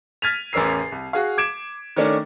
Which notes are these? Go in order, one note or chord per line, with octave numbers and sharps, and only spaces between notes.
F6 G#6 A6 B6 D#7 F7
A1 E2 C#4 A#4 E6 C7
C2
F#4 G#4 F5
D6 G#6 D7 E7
D#3 A3 C#4 D4